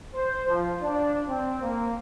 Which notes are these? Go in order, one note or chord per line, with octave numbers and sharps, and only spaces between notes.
C5
F3
D4
C4
A#3